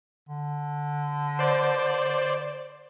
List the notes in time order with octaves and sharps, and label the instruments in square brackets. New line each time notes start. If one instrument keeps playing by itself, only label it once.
[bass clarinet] D3
[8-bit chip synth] C5 D5